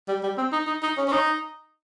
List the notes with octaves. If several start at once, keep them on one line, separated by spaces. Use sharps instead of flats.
G3
G3
C4
D#4
D#4
D#4
C#4
C#4
D#4